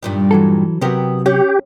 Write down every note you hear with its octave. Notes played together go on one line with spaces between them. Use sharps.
G2 A#2 D#3
E3 F#3 A4
C3 F#3 B3 G4 A#4
C#4 G4